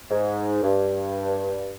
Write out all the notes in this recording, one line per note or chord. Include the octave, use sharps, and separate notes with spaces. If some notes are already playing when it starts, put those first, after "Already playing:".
G#2
G2